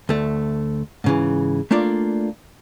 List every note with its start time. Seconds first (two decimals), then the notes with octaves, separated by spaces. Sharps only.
0.09 D2 A3
1.04 G#2 C#3 E3
1.71 A3 A#3 D4 F4 D5